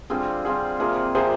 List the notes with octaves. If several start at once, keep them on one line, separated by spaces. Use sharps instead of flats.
D3 G3 C4 F4 G#4
D3 G3 C4 F4 G#4
C3 F3 A#3 G#4
C3 F3 A#3 G#4 C5